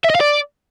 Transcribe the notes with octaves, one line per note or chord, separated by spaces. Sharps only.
E5
D#5
F5
D5